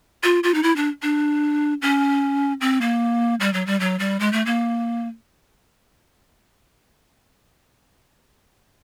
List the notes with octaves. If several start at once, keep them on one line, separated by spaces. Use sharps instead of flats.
F4
F4
D#4
E4
D4
D4
C#4
C4
A#3
G3
F#3
G3
F#3
G3
G#3
A3
A#3